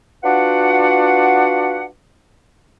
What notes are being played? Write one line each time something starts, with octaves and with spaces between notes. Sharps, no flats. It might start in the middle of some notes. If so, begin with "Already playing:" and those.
D4 F4 F#4 B4 F#5